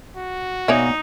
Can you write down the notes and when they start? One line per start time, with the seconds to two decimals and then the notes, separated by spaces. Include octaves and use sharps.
0.17 F#4
0.68 B2 A#3 D#4 C#5 D5 E5 G#5